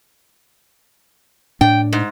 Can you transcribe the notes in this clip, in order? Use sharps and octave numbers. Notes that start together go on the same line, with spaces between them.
A2 D4 G5
G#2